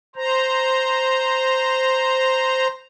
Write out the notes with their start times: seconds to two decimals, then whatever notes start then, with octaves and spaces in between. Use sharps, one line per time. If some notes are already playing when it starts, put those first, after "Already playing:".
0.16 C5 A#5